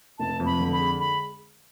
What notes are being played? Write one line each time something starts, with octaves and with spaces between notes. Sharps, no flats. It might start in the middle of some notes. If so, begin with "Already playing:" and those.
F1 A5
F2
B5
D3
B5
G#3
B5